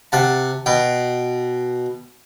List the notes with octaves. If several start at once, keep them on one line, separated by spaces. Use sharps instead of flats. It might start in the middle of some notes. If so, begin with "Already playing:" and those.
C3 F#5 A5
B2 G5